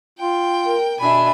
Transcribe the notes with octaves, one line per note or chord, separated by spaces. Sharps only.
F4 G5
A#4
B2 D4 E5 G#5 B5